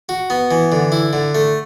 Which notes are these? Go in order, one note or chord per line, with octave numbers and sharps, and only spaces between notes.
F#4
B3
E3
D3
E4
D3
A3